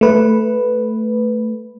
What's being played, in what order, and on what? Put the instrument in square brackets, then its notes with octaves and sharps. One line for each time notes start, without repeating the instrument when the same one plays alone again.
[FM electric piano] A3 B4